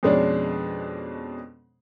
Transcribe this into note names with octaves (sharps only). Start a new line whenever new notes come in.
F2 B2 G#3 C#4 D4